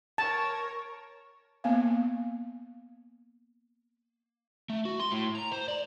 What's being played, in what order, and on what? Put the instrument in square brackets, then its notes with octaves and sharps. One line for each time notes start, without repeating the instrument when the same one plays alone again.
[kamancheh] A#4 C#5 [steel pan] A5
[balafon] A#3 B3 F5
[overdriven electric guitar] A3
F#4
C6
A2
A#5
C5
D5